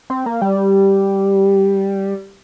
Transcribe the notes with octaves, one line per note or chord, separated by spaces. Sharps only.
C4
A#3
G3